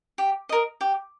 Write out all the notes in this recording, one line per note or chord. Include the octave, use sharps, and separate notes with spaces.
G4
A#4 D#5
G4